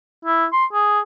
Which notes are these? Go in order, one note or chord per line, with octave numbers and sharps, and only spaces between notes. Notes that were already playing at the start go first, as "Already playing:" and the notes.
E4
C6
G#4